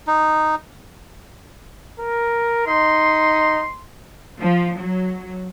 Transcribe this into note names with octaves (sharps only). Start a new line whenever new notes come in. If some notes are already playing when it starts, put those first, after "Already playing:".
D#4
A#4
D#4 C6
F3
F#3